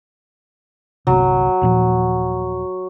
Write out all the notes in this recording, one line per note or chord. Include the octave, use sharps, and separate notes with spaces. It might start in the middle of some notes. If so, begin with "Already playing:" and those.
G1 C2 C3 F#3
D#1 A#2 F3